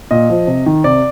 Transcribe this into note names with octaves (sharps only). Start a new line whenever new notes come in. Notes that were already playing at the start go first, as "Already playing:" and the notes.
A#2 D#5
F3
C3
D#3
C3 D5